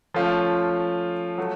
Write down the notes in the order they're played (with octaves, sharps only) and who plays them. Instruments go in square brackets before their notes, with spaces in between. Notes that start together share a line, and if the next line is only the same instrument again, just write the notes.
[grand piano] F3 A3 C#4 F4
F#3 A3